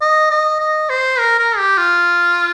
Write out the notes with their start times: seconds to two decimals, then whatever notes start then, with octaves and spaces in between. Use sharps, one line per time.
0.01 D#5
0.30 D#5
0.60 D#5
0.89 C5
1.19 A#4
1.39 A#4
1.58 G4
1.77 F4